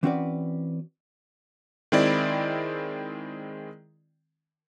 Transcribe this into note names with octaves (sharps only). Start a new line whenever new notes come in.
E3 C4 C#4 F#4 B4 D5
D#3 G#3 C4 E4 D5